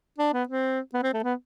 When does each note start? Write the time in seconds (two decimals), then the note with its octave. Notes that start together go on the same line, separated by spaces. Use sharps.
0.18 D4
0.33 B3
0.49 C4
0.94 B3
1.03 C4
1.14 A3
1.24 B3